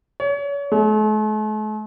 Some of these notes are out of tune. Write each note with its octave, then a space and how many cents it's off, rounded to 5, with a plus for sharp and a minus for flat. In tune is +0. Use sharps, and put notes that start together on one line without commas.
C#5 +35
A3 -45